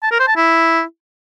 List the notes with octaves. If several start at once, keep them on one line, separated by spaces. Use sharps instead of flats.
A5
A#4
C5
A5
E4